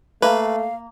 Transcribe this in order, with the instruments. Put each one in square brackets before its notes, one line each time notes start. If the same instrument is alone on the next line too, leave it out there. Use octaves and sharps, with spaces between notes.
[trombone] A3 [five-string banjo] A#3 [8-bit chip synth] B4 [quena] F5